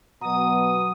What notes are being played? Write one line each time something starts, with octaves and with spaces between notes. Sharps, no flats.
B2 F#3 F#5 A#5 D#6